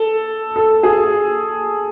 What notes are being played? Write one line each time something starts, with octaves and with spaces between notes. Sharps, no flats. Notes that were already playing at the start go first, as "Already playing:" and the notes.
Already playing: A4
A4
G#4